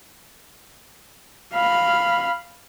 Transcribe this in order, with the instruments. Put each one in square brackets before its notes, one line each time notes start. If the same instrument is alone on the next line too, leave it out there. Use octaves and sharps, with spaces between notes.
[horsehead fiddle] F5 B5